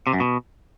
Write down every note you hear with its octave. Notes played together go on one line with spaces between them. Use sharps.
C3
F#2
B2